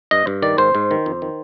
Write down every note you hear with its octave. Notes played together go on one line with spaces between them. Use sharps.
G2 D#5
G2
D#3 D5
G#2 C5
G#2
D#3
F2
D#3